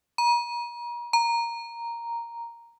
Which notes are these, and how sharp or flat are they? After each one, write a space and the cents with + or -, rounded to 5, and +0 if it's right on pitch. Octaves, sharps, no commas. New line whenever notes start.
A#5 +40
A#5 +0